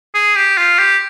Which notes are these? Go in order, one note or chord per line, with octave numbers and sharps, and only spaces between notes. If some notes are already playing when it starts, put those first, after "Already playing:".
G#4
G4
F4
G4